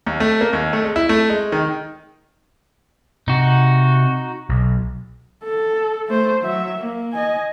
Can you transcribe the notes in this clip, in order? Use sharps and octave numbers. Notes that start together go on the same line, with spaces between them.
D#2
A3
A#3
D#2
A3
G#3
E4
A3
G#3
D#3
C3 D#4 F#4
B1
A4
A3 C5
F#3 E5
A#3
D#5 G#5